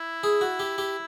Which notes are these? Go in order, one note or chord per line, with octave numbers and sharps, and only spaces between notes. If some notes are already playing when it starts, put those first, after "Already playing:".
Already playing: E4
G#4
F#4
G4
G4